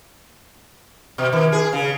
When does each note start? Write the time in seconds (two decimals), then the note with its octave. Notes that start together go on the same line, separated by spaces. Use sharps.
1.18 B2
1.33 D#3
1.52 G#4
1.73 C#3